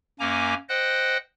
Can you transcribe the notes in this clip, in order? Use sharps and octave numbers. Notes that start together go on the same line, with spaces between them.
F#2 A#3 C#4 G#5 A#5 D6
C5 D#5 F#5 G5 F#6